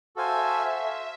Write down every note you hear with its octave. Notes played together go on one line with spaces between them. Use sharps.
F#4 A4 C5 E5 F5 G#5